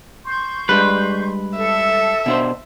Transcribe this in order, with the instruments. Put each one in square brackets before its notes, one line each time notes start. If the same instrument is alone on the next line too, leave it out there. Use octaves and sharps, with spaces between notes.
[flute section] C6 C#6 G6
[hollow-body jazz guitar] G3 G#3 D4 [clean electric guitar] B4
[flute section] A4 [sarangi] E5
[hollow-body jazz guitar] B2 D4 C5